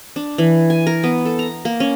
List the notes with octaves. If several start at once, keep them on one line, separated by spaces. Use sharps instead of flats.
D4
E3
G#5
A#4
B3
A4
A#5
A#3
C#4